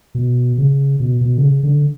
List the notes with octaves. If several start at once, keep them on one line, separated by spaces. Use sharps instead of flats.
B2
C#3
B2
B2
D3
C#3
D3